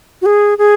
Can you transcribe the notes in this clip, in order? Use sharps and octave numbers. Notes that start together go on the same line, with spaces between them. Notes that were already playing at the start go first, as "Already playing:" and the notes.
F#4
G#4
G#4